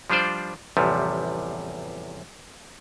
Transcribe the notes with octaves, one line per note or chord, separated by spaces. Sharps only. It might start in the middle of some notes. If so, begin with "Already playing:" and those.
F3 G3 D4 F4 C5 D5
A1 E2 C3 F3 G3